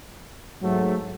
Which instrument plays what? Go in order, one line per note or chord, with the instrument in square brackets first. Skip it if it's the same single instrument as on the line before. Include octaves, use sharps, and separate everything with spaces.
[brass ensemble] G#2 F#3 A3